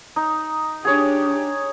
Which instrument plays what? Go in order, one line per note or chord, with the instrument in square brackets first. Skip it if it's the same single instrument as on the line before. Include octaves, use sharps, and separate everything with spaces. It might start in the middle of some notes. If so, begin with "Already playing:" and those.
[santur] D#4
[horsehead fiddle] D4 G4 [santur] G#4 C#5